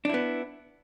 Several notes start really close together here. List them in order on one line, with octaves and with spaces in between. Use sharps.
D4 E4 B3